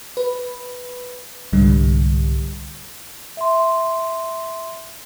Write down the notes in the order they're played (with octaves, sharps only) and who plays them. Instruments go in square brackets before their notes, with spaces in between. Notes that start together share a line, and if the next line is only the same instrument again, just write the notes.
[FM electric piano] B4
C2 G#2 D3 G3
[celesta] E5 C6